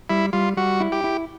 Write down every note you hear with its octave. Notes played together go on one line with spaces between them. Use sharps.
G3 E4
G3 F4
G3 F#4
E4
G4
E4